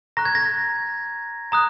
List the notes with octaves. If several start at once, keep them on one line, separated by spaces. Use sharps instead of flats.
A#5 C#6 F#6 A#6
G#6
A#6
A#5 D#6 F#6